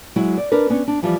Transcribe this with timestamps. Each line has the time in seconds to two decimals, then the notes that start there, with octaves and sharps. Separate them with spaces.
0.16 F#3 G#3 E4
0.38 D5
0.52 D4 A#4 B4
0.70 B3 C#4 D4
0.88 D4
1.02 E3 F3 G3